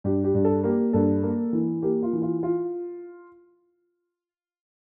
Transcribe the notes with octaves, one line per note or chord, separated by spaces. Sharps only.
G2 G4
G4
G2
A4
A#3 G4
G2 A4
A#3
E3
A#3 G4
F4
E3
F4
F4